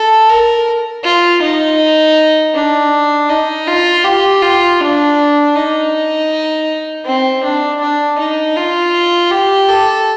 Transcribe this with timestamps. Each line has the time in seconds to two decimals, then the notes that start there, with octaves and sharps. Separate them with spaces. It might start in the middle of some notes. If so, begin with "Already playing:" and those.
Already playing: A4
0.29 A#4
1.04 F4
1.41 D#4
2.54 D4
3.29 D#4
3.67 F4
4.04 G4
4.42 F4
4.80 D4
5.55 D#4
7.05 C4
7.43 D4
7.81 D4
8.18 D#4
8.56 F4
9.31 G4
9.68 A4